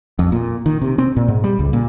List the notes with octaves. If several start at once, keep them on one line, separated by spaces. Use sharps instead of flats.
F2
A#2
D#3
C3
C4
A#2
G#2
G3
C#2
A#2